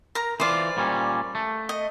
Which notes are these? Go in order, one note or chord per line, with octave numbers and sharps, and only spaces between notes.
A#4 A#5
E3 F4 C5 D5
A#2 G3 C#4
A3
D#5